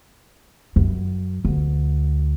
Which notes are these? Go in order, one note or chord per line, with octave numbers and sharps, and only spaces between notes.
F#2
D2